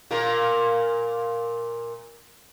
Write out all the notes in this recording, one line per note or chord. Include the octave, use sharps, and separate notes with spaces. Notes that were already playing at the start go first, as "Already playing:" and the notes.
A#2 A#3 A#4